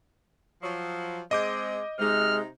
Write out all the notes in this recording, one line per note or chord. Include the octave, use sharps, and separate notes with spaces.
F3 F#3
G#3 C4 D#5 D6 G6
C3 G#3 D#4 F6